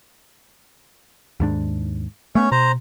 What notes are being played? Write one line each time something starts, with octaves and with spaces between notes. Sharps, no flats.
D#2 G#2 D4
A3 B3 C#4 C#5
B2 C5 A#5